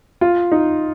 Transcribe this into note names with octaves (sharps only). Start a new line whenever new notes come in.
F4
D#4